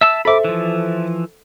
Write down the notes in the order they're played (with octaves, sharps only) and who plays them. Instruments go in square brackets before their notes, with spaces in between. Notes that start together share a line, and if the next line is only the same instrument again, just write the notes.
[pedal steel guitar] E5 A5 E6
[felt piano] A4 C5 E5 [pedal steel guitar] B5 D6
[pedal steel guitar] E3 F3